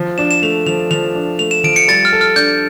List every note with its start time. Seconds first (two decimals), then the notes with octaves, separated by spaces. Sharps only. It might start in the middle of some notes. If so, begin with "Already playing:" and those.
Already playing: F3
0.18 D4 E7
0.31 E7
0.42 A3 F7
0.66 F3 F7
0.91 F3 F7
1.15 D4
1.39 A3 F7
1.51 E7
1.64 F3 D7
1.76 C#7
1.88 G3 A6
2.05 F6
2.12 A4
2.21 F6
2.36 D4 G6